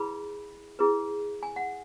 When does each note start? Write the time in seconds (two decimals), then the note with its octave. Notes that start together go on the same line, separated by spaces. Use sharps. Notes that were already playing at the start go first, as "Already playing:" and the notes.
Already playing: E4 G#4 B4 B5
0.79 E4 G#4 B4
1.43 G#5
1.56 F#5